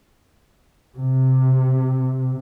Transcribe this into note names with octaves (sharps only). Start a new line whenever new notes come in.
C3